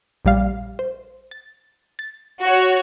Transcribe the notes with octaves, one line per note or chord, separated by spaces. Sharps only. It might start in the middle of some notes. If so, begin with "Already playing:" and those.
A#1 G3 F5
C5
A6
A6
F#4 C#5